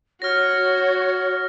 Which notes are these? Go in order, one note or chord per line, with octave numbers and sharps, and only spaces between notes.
F#4 C#5 F6 A#6